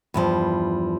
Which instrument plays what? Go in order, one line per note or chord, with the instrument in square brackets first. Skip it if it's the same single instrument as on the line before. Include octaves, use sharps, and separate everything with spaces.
[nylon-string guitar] E2 G2 F3